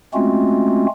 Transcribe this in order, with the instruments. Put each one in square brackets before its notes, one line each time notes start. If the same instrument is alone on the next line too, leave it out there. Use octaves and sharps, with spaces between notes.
[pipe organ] G#3 A3 C4 C#4 F4 F#4